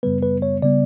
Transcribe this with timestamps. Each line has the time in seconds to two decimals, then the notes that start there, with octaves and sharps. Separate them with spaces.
0.03 F#2 C#3 G3 B3 B4
0.22 B4
0.42 C#5
0.62 C#3 G3 B3 D5